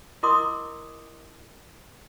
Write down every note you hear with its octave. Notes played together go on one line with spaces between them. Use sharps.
E4 A#4 D#5 C6 D6 D#6